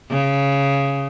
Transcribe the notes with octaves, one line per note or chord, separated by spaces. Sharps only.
C#3